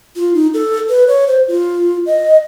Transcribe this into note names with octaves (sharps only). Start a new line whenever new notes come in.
F4
D#4
A4
B4
C#5
C5
F4
D#5